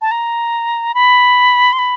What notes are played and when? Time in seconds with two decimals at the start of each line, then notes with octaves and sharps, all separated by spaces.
0.01 A5
0.11 A#5
0.94 B5
1.73 C6
1.79 B5